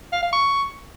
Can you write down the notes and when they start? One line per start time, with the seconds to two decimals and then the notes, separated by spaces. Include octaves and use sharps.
0.13 F5
0.23 F5
0.33 C#6